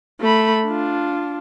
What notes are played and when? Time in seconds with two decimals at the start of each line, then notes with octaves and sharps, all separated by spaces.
0.21 A3 B5
0.65 D4 F4